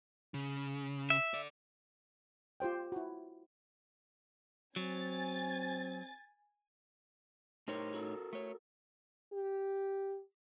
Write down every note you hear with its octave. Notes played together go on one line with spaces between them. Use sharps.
C#3
E5
A4 D5
F4 G4 C5 G5
E4 F#4
F#3 C4 G#5 A6
A2 D#4 G4 A#4 C5 C#5
F#4 A4 A#4
A3 C#5
G4